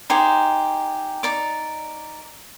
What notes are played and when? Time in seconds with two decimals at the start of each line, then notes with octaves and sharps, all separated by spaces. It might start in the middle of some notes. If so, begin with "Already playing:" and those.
0.10 D#4 G4 G#4 C5
1.23 D#4 D5 D6